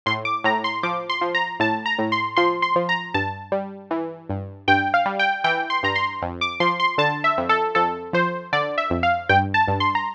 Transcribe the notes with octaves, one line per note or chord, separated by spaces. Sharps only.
A2 C6
D6
A2 A#5
C6
F3 D6
C6
F3
A#5
A2 A5
A#5
A2
C6
F3 C6
C6
F3
A#5
G2 A5
G3
E3
G2
G2 G5
F5
G3
G5
E3 G5
C6
G2 A#5
C6
F2
D6
F3 C6
C6
D3 A5
E5
F2
A4
F2 A4
F3 C5
D3 D5
E5
F2
F5
G2 G5
A5
G2
C6
A#5